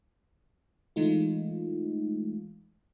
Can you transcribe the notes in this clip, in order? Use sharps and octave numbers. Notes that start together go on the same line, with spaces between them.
E3 G#3 A3 D#4 F4